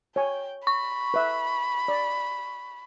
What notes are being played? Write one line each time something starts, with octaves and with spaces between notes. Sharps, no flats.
C#5 G5 G#5
B5 C#6
B4 E5
D5